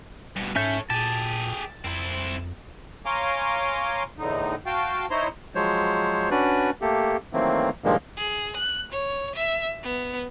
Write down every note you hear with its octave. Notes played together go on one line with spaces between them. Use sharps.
G2 B2
G#2 C#4 A4 C#5 E5 G6
A#2 G4 G#4 A5
F2 C4 E4
C#5 F5 G#5 A#5 C6 D6
E2 A2 D3 D#4
F#4 F5 G5 A5
D#4 E4 C5 C#5 A#5 C6
F3 F#3 G#3 C5 C#5
C#4 D4 F#4 B4 D5
A3 A#3 G4 A4
D#3 E3 F#3 A3 A#3 C4
G2 A#2 D#3 F3 G#3 A#3
G#4
F#6
C#5
E5
B3